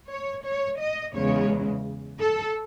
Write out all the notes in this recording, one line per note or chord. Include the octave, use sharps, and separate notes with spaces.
C#5
C#5
D#5
E2 C#3 G#3 C#5
A4